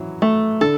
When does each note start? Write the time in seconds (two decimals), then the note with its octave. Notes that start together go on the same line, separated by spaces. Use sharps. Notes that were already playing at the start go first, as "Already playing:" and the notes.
Already playing: E3 F#3
0.22 A3
0.61 D3 A4